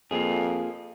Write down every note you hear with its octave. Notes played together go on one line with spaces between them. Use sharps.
F2 A#3 F4 G#4